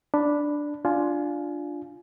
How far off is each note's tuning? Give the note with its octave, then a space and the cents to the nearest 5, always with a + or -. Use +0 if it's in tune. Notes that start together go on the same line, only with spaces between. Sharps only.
D4 +0 B5 +0
D4 +0 F4 +0 G#5 +20